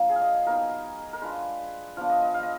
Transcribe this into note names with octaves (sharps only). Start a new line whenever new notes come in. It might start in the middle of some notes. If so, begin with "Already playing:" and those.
Already playing: F3 A#3 D4
G#4
F5
D#5
F#3 B3 D#4 A#4
A#4
G#3 D4 F4 B4
F3 B3 D4 F5
D#5
D#5
F5
D#5